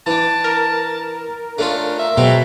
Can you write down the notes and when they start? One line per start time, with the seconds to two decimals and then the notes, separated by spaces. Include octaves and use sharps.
0.06 E3 D4 A5
0.44 A#4
1.58 A3 C#4 D4 F4
1.99 E5
2.17 B2 F#3 G#3 C4